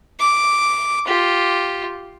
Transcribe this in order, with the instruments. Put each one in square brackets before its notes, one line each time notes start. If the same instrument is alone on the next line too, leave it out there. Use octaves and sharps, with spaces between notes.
[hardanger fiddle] D6
F4 G4